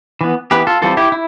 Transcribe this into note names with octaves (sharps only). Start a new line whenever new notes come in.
E3 B3
E3 B3 G4 B4
F4 A4
E3 G3 C4 F4 A4
E4 G4
E4